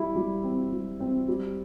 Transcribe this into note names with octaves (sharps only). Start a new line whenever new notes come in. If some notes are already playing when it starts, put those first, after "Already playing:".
Already playing: G3 E4
G3
C4
G3
C4
G3